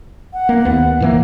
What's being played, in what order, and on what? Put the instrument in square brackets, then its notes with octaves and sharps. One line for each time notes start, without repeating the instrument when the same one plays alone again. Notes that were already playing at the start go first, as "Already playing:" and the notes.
[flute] F#5
[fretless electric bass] A#3
D#2 B3
A2 E3 A#3